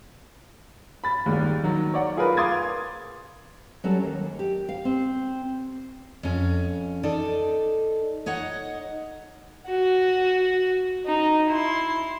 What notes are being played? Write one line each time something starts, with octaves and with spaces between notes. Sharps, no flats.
B5 A6
D#2 G#2 D#3 G3 G#3
D#3 F#3
C#5 D5 F#5
F4 G#4 A#4 B4
F5 C6 D6 D#6 G#6 A6
F#3 G3 C#4 A4
D#2
G4
F5
C4
F2 C#4
D#4 A4 D5
D#4 C#5 D#5 F#5
F#4
D#4
E4 C6